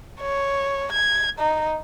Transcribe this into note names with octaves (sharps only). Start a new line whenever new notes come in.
C#5
G#6
D#4